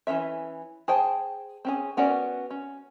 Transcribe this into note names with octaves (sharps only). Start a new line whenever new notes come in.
E3 F#3 C#4 E5
G#4 C5 G5 A5
C4 C#4 G#4
B3 C#4 F#4 A#4 D5
C#4